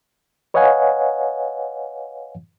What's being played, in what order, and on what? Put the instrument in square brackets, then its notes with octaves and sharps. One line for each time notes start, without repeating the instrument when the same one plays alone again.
[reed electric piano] B4 C#5 D#5 F5 F#5 G#5